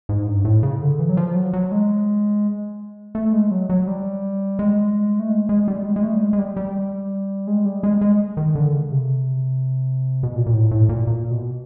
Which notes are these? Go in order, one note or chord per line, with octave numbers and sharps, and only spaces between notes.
G#2
G2
A2
C#3
D3
E3
F#3
F3
F#3
F#3
G#3
A3
G#3
F#3
F#3
G3
G#3
A3
G#3
G#3
G3
G#3
G#3
A3
G3
G#3
G#3
G3
G3
G#3
G3
G#3
G#3
D#3
D3
C#3
C3
B2
A#2
A#2
A2
A2
A#2
A#2
B2